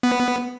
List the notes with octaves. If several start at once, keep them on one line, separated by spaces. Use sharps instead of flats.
B3